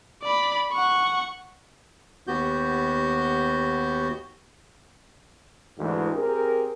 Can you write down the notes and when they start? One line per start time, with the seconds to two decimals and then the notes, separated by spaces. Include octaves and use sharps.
0.23 D5 B5
0.72 F#5 C#6
2.27 D#2 B3 F#4 G4 G6
5.78 D2 G#2 E3
6.15 C4 G4 G#4 A#4